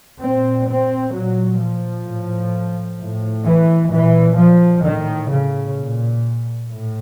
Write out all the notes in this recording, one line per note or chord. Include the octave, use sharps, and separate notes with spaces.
A#2 C4
C4
A#2 F#3
F3
A2
A2
E3
A#2 E3
F3
A2 D#3
C#3
A#2
A2